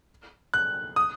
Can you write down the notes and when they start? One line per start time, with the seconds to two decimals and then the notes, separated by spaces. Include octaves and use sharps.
0.54 F#6
0.96 D#6